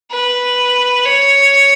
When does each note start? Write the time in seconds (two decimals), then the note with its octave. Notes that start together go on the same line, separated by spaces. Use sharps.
0.12 B4
1.06 C#5